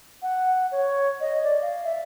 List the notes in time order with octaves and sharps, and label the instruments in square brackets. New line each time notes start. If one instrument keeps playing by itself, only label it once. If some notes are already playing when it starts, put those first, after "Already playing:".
[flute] F#5
C#5
D#5
D5
F5
E5